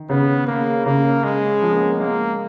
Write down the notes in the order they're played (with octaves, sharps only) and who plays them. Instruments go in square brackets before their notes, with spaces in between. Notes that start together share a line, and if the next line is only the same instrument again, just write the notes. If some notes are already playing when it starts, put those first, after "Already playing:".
Already playing: [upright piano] D#3
[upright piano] C#3 [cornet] B3
[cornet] A#3
[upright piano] C#3 [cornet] A#3
[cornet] G#3
[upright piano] F3
A#3
B3
C#4
B3
[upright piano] G#3 [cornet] A#3